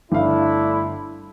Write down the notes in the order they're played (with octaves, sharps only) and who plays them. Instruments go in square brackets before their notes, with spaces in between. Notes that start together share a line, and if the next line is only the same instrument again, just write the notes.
[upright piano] G1 F5 [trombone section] A3 D4 E4